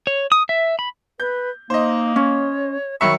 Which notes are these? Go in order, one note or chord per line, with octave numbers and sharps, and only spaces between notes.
C#5
D#6
E5
B5
B4 G6
A#3 D#4 C5 D#5
C#4 C#5
D#3 F#3 E5 B5 C#6